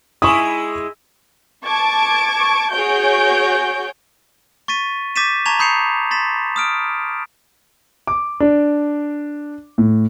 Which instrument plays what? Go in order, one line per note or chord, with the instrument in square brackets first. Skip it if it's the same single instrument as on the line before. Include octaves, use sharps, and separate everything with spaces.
[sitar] G#3 E4 [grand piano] G#5 C#6 D#6
[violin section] A5 C#6 D6 G#6 D7
F#4 G#4 C#5 G6 D7
[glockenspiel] C#6 A6 B6 D#7
D6 G6 A6 B6 D#7 E7
A5 A#5 C#6 G#6 E7 F7
B5 D#6 G6 C7 C#7 F7
C6 A6 B6 E7
D#6 F6 D7
[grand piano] D6
D4
A2